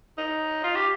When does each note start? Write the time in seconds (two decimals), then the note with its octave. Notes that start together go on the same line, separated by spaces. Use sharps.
0.18 D#4
0.64 F4
0.76 G4